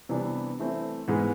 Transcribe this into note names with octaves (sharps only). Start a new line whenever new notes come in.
C3 E3 G3 B3 D4
E3 A3 C4 E4
G#2 E3 G#3 B3